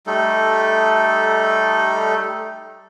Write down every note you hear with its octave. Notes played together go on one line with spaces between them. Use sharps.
G3 A3 D#4 A4